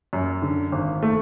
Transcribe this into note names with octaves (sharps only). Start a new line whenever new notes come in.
F#2
D3
G#1
A3